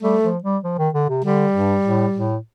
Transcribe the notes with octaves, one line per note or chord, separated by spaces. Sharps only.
G3 A3
F3
G3
F3
D#3
D3
C3
D3 G3
G2
A2
A2